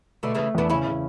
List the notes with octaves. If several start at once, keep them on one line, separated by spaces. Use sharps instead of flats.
B2 D3 A3
C#3 E3 A3
E2 B3 D4
C#3 C#4 E4
C#3